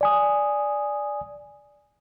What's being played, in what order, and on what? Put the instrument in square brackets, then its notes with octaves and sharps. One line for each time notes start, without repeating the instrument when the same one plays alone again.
[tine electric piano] D5 G#5 D#6